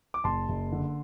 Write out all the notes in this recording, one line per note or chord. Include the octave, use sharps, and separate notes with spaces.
D6
F#1 A5 C6
F#1
D3